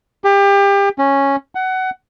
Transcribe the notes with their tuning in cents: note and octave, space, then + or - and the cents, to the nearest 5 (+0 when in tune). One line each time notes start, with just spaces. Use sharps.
G4 +30
C#4 -5
F#5 +20